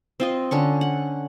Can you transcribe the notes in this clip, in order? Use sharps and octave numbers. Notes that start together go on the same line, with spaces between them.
C4 F4 D#5
D3 C#4 C#6
F#5